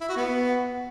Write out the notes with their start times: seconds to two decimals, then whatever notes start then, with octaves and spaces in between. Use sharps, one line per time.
0.01 E4
0.09 F#4
0.17 B3